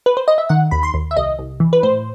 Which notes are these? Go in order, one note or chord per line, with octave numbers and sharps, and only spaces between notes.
B4
C5
D#5
E5
D#3 F#5
D#2 B5
C6
D#2
E5
C2 D#5
C2
E3
B4
A2 C5